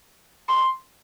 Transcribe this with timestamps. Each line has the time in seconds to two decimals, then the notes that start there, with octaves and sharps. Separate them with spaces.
0.49 C6